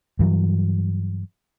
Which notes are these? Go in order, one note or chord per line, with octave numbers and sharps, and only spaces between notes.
G2 E3 F#3